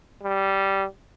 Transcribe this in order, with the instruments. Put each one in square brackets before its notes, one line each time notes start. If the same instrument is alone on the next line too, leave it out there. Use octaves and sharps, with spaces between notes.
[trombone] G3